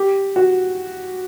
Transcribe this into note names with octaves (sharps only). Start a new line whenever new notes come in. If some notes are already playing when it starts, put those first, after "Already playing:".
Already playing: G4
F#4